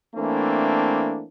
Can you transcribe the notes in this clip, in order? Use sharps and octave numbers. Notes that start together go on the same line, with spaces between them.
E3 A3 A#3 C4 D4